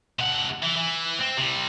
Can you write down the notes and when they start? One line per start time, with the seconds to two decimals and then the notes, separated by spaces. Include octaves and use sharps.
0.19 C3 F#5
0.63 E3
0.77 E3
1.19 C4
1.37 C3 G3